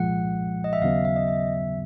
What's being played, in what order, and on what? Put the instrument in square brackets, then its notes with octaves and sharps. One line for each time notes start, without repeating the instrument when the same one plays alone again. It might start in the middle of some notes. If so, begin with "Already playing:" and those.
Already playing: [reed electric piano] C2 A#2 F3 G#3 [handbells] F#5
[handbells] D#5
E5
[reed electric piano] D#2 C#3 F#3 B3 [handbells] F5
[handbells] E5
D#5
E5